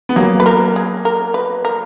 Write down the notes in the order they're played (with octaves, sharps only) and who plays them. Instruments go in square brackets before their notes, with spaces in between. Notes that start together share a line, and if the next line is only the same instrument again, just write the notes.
[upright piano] B3
[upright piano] F#3 A#3 [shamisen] G#4
[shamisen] B4
A#4
G#4
A#4
B4
A#4